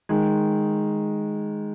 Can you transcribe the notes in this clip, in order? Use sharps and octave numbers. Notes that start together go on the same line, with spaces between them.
D#3 G#3